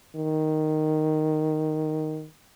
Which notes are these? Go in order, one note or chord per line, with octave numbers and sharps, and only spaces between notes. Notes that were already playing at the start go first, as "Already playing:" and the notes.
D#3